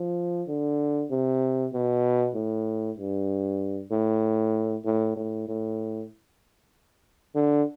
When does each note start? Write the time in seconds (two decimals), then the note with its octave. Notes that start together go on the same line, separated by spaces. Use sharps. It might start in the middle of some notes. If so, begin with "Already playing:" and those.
Already playing: F3
0.48 D3
1.11 C3
1.73 B2
2.35 A2
2.97 G2
3.92 A2
4.85 A2
5.16 A2
5.48 A2
7.35 D3